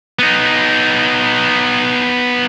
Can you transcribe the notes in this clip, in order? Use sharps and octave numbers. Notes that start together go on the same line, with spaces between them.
B3 D#4